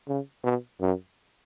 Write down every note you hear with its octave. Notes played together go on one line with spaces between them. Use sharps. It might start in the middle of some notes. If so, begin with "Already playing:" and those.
C#3
B2
F#2